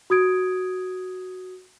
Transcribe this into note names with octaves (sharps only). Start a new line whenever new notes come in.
F#4 D#6 G#6 D7